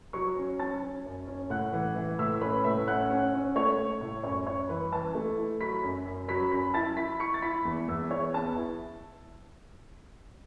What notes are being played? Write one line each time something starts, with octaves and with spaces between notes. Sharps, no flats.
F#3 C#6 C#7
C#4
C#4 A5 A6
C#4
F#2
C#4
A2 F#5 F#6
E3
E3
A2 E5 E6
C#4 B4 B5
A2 E5 E6
C#4 F#5 F#6
C#4
C#4
A3 C#5 C#6
A3
A2
F#2 C#5 C#6
F#2 C#5 C#6
E3 B4 B5
E3 A5
A3
E4
F#3 B5 B6
F#2
F#2
F#3 B5 B6
F#2 B5 B6
E4 A5 A6
E4 B5 B6
E4 C#6 C#7
A6
E4 B5 B6
E2
E2 E5 E6
E2 C#5 C#6
B3 A5
E4